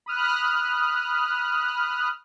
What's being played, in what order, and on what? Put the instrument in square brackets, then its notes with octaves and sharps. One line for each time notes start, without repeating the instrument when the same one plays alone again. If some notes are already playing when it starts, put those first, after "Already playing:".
[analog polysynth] B5 D#6 F6 F#6